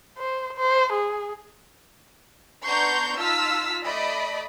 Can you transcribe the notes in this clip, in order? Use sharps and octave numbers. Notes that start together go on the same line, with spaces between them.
C5
C5
G#4
B3 D4 A#5 C6 C#6 G6
D#4 F4 A5 E6 F6 B6
A3 D5 D#5 B5